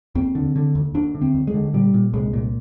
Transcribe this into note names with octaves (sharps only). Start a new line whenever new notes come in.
D#2 C4
D3
D3
D#2
D#2 D4
D3
C4
D#2
G#3
D3
A#2 G3
A#2
C2 G#3
A#2